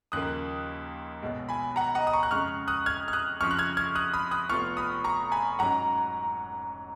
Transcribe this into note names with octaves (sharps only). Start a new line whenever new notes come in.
D#2 C#3 F3 A#3 D#6 F#6
B1 B2 G#3
G#5 B5
F#5 A#5
D#5 F#5
D#6
A#5 C#6
F#6
F2 C#3 G#3 C#6 F6
D#6 F#6
F6 G#6
F6
D#6 F#6
F2 C#3 F3 C#6 F6
F#6
F6 G#6
F6 G#6
D#6 F#6
B5 D#6
D#6 F#6
F1 F2 F3 B3 F4 C#6 F6
B5 D#6
A#5 C#6
G#5 B5
G#2 F#3 C#4 F#5 A#5